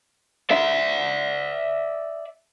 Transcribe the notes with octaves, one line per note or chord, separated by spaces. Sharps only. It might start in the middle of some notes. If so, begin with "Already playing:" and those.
D5 E5